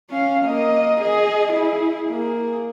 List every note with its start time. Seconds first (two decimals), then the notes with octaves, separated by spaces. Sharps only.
0.10 C#4 F5
0.45 A#3 D#5
1.00 G#4 D#5
1.52 E4 G#4
2.10 A#3 G#4